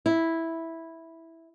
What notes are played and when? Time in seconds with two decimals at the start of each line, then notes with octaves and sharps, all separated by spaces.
0.06 E4